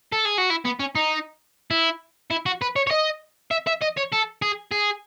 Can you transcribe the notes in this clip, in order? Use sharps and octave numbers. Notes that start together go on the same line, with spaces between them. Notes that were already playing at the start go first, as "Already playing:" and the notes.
A4
G#4
F#4
E4
B3
C#4
D#4
E4
E4
F#4
B4
C#5
C#5
D#5
E5
E5
D#5
C#5
A4
G#4
G#4